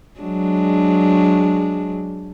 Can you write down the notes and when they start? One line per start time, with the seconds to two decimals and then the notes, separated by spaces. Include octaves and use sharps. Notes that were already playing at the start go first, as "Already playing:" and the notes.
0.20 F#3 G#3 D4